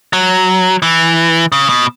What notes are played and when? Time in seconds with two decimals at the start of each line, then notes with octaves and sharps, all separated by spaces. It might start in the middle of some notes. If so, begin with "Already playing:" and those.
0.13 F#3
0.82 E3
1.52 C#3
1.69 B2